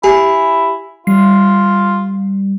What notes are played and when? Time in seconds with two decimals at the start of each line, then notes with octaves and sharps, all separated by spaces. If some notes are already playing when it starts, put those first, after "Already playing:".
0.03 E4 G4 G#5
1.07 G3 F4 C7